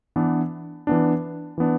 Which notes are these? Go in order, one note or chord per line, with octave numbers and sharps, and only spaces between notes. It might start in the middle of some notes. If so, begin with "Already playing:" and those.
E3 B3 D4
E3 B3 D4
E3 B3 D4